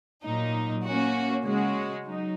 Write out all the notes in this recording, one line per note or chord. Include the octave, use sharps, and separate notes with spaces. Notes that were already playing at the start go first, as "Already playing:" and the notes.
A#2 F#3 D#4
A#3 C#4 F#4
C#3 G#3 F#4
F#3 D#4